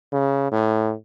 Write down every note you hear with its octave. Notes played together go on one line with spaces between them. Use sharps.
C#3
A2